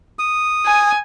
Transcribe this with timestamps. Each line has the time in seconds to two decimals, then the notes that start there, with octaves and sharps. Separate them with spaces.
0.19 D#6
0.66 G#5